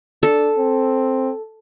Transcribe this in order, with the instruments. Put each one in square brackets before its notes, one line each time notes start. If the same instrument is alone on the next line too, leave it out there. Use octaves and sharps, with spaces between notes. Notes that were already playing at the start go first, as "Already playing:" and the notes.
[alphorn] D4 [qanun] A4
[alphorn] C4